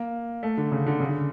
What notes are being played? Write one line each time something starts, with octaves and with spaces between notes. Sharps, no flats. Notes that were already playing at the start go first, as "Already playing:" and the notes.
Already playing: A#3
A3
D3
C#3
D3
C#3
D3